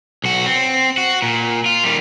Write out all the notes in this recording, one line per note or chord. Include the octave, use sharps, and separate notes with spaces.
B1 F#4
C4
F#4
A#2
F4
D#3 G3